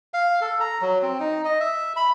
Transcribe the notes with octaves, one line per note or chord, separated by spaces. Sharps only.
F5
A4
A#5
F#3
C4
D#4
D#5
E5
B5